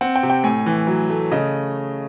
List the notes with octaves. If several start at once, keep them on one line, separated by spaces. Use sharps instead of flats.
C4 F#5
G5
C3
G5
A2 G#5
E3
F#3
A3
C#3 D#5